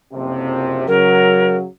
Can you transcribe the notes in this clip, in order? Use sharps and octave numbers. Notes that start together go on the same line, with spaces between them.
F#1 F2 C3
C#3 F#3 A#4